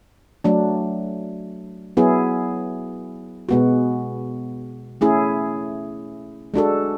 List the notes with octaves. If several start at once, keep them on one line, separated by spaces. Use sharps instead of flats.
F#3 A3 D4
F#3 B3 E4 G#4
B2 G#3 B3 F#4
A3 C#4 E4 G#4
G#3 D4 F#4 A4